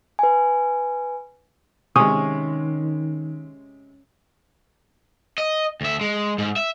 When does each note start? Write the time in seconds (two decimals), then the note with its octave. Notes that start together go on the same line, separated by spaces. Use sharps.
0.19 B4 G#5
1.96 C3 D#3 G#3 C#4 D#6
5.38 D#5
5.81 D2 E5
6.01 G#3
6.38 G#2
6.56 E5